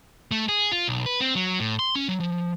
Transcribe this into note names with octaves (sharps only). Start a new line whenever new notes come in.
A3
G#4
F4
B1
B4
C4
F#3
A2
C6
C#4
F#3
F3